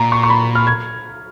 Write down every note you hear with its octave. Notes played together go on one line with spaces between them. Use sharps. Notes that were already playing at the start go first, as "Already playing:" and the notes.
Already playing: A#2 A#5
C#6
C#6
B5
F6
G#6